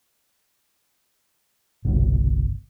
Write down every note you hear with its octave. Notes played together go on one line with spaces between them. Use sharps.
G1 C2 B2